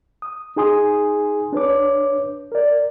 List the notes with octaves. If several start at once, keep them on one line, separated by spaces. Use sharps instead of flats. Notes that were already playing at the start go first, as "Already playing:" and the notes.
D#6
D#4 G#4 G#5 C6 D#6
D4 B4 C#5 D6
A#4 D5